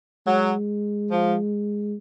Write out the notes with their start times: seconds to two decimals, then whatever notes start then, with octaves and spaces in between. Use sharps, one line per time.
0.27 F#3 G#3
1.10 F3